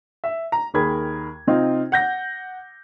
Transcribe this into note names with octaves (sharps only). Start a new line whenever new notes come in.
E5
A#5
D#2 D#3 G#4 A#4 B5 G#6
C3 C4 D#4 F4
F#5 G6 A#6